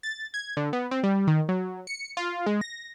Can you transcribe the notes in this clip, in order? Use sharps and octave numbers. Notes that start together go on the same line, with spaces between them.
A6
G#6
D3
B3
C4
G3
D#3
F#3
C#7
F4
G#3
A#6